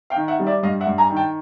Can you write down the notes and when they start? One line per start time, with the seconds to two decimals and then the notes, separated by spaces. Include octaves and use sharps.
0.10 F5 G5
0.16 D#3
0.28 E5 F#5
0.40 G3
0.47 D5 E5
0.63 G2 D#5 F5
0.80 E5 F#5
0.87 G2
0.98 G#5 A#5
1.10 D#3
1.16 G5 A5